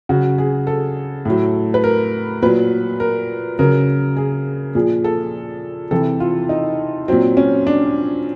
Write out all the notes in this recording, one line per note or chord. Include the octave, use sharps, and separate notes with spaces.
C#3 F#3 F#4
G#4
A4
A2 F#3
B4
A#4
A#2 F#3 B4
A#4
C#3 F#3 A#4
G#4
A#2 F3 G#4
A4
C3 E3 A4
F4
D#4
A#2 F#3 C4
C#4
D4